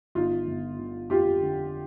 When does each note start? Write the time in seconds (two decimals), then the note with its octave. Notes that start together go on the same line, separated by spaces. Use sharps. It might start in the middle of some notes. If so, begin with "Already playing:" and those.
0.15 G1 D#4 F4
0.47 G1
0.79 D3
1.10 F2 F4 G4
1.42 D3